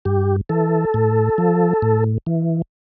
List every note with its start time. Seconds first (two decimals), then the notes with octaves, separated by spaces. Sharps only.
0.05 G2 G4
0.49 E3 A4
0.94 A2
1.38 F3
1.82 A2
2.26 E3